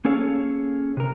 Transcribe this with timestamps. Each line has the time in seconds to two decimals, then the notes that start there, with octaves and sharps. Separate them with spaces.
0.05 A#3 C#4 G#4 A4 C#5 F5
0.97 C3 A#4